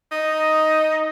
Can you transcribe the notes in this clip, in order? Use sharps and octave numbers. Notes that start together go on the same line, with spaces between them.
D#4